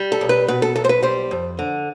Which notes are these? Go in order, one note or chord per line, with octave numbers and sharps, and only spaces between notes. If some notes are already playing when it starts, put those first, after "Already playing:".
Already playing: G3
A4
B1
B4
B2 B4
A4
B1 A4
C5
B4
G3 C5
F2
D3